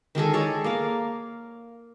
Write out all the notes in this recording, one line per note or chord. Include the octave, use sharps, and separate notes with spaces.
D#3 G#3 G#4 A4
G#3 A4 C#5 D5
A#3 F5